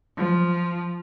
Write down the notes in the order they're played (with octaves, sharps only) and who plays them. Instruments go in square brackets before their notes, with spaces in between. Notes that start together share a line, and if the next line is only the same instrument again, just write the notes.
[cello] F3